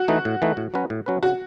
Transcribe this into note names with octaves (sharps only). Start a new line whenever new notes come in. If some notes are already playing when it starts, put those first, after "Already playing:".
Already playing: F#4
E3 A3 D#4
A2
E3 A3 D#4
A2
F#3 C#4 F#4 B4
A2
F#3 C#4 F#4 B4
C#3 F#4